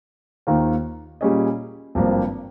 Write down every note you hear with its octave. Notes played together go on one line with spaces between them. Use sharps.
D#2 D#3 A#3 F4 C5
A#2 G3 C#4 G#4 D#5
G#1 G2 F3 A#3